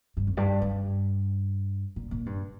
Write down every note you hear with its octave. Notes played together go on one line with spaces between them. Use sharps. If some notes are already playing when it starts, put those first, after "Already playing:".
G2
F2
G2
G2
A#2
A#2
G2